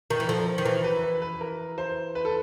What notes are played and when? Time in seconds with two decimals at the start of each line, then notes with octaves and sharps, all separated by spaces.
0.10 D#3 A#4
0.20 E3
0.28 F3 A4
0.47 A#4
0.58 D#3
0.65 E3 A#4
0.84 B4
1.03 B4
1.22 B4
1.41 A#4
1.78 C5
2.15 B4
2.25 A4